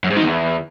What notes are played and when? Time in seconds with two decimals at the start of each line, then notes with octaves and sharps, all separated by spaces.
0.04 F#2
0.10 G#2
0.17 D#3
0.23 E2